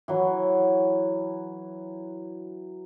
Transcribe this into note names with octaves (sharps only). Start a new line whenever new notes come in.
E3 F#3